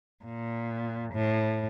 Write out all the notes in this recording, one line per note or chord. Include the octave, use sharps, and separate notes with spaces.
A#2
A2